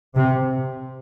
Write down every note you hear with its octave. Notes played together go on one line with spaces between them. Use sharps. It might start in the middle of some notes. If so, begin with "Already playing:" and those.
C3